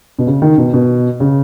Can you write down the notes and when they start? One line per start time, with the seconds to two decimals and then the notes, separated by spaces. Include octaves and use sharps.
0.19 B2
0.27 C#3
0.42 D#3
0.58 B2
0.74 B2
1.20 C#3